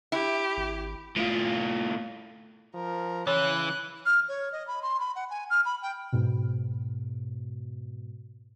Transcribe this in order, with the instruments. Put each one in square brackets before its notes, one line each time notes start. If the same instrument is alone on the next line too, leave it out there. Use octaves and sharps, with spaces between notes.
[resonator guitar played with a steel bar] E4 [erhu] G4
[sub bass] G#1
[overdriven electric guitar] A2 F4
[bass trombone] F3 [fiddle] A#4
[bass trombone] C#3 [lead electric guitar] E3 [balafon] C#5 [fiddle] F#6
[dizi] F6
C#5
D#5
B5
C6
B5
F#5
G#5
F6
B5
G5
[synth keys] G#2 B2